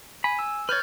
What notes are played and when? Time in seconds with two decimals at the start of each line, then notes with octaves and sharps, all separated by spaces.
0.24 G#5 B5
0.39 E6
0.69 B4 C#5 F6 G6 A6